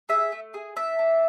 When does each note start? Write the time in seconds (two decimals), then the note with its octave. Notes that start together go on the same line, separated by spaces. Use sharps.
0.09 G#4 E5
0.32 A3
0.54 G#4
0.76 D4 E5
0.99 D4